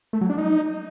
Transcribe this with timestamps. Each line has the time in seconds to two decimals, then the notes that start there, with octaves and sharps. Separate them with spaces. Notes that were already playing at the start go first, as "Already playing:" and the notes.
0.13 A3
0.21 F#3
0.29 D4
0.38 D#4